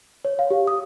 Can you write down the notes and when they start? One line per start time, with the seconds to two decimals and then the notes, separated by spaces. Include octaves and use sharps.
0.25 C#5
0.39 F5
0.51 G4
0.67 D#6